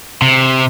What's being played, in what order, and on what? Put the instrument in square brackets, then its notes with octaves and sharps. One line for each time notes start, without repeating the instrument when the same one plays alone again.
[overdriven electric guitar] C3